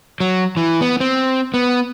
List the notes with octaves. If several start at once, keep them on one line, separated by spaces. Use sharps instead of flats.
F#3
E3
B3
C4
B3